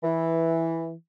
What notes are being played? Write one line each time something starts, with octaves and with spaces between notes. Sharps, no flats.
E3